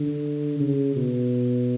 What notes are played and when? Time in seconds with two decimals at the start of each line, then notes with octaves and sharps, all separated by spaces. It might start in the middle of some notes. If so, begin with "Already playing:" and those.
Already playing: D3
0.60 C#3
0.96 B2